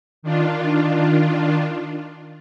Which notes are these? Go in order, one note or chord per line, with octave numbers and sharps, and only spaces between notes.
D#3 D4 F4